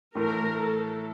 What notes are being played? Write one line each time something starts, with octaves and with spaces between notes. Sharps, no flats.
A2 E3 A3 A#4
A4